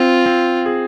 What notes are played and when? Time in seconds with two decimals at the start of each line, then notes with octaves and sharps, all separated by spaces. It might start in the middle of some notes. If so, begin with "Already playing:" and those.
Already playing: C4 F4
0.26 C4
0.66 G#4